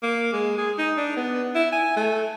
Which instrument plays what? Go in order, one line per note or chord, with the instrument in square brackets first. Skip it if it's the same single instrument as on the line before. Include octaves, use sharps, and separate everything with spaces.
[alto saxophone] A#3
G#3
G#4
D#4
D4
B3
E4
G#5
A3